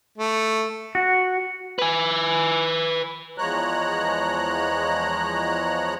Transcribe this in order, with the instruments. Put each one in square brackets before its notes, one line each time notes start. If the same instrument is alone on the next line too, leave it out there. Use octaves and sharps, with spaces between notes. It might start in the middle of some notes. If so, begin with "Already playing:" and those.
[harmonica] A3
[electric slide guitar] F#4
[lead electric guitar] B4 G#5
[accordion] E2 F3 G#3 C#5 A#5 F#6